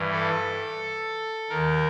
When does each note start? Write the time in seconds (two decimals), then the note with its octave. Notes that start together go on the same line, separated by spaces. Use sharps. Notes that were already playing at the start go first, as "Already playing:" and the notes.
Already playing: G2 E3
0.11 A4
1.49 D#2 D#3 A#4